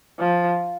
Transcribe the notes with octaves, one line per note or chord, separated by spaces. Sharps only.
F3